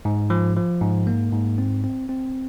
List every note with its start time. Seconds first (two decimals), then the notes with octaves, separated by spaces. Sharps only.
0.05 G#2
0.30 F3
0.56 F3
0.81 G#2
1.07 A#3
1.32 G#2
1.58 C4
1.84 C4
2.09 C4